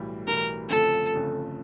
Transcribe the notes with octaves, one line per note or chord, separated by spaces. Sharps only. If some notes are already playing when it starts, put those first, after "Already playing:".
Already playing: B1 A2 E3 G3
B1 A2 E3 G3 A#4
G1 F2 C#3 F3 A3 A4
G1 F2 C#3 F3 A3